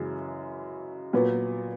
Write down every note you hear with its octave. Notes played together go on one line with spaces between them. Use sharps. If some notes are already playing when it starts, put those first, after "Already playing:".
Already playing: F#2 C#3 E3 G#3 C#4
A#2 F#3 B3